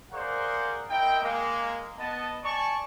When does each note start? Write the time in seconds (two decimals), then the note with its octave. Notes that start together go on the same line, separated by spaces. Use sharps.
0.13 G#4 A#4 C5 D5 F5 F#5
0.90 C4 E4 A#4 D#5 G5
1.22 G#3 A#3
1.99 B3 D#5 A5
2.44 D5 G#5 A5 C#6